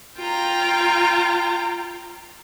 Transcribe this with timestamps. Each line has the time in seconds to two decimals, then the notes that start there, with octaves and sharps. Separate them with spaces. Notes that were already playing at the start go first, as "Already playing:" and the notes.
0.19 F4 G5 A#5